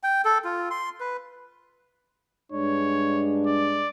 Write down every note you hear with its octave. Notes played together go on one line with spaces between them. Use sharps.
G5
A4
F4
C6
B4
G2 G#3 D4 C#5
D5